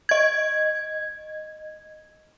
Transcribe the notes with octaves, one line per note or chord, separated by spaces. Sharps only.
D#5 G#6